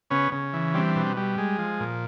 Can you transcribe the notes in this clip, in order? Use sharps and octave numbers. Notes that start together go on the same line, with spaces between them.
C#3 B3 C#4
C#3
E3
G3 C4 D4
B2
G3
G#3
F3
A#2